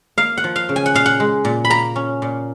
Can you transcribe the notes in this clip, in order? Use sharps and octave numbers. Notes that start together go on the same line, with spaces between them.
A#3 F5
F#5
F3
F5
C#3
G#5
F#5
A#2 F5
F#5
G#3
A#2
B5
A#3 A#5
C#4
A#2